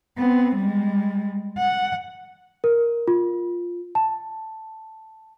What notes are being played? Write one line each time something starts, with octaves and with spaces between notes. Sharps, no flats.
B3 C4
G3 G#3
F#5
A#4
F4
A5